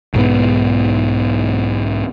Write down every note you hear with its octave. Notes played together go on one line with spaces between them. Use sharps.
B1 G#2 B3